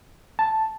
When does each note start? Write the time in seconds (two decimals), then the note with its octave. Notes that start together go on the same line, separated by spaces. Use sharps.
0.39 A5